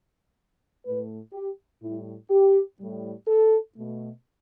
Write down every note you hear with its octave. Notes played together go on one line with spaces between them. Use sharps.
A2 A3 B4
G4
A2 G3 E4
G4
A2 G3
A4
B2 A3